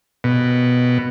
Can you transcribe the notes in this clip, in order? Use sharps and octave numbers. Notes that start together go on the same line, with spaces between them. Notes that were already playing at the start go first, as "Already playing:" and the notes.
B2